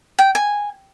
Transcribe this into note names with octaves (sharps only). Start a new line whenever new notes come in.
G5
G#5